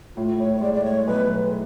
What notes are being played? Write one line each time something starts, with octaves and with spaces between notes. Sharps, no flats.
A2 F4
A2 C#5
C#5
G#3 D5
D5
A2 C#5
B1 B4
B1